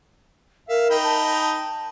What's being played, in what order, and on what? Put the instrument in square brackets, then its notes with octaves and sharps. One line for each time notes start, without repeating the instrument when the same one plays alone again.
[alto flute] A#4 [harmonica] E5 F5
[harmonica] D#4 G5 B5
[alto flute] A5
A5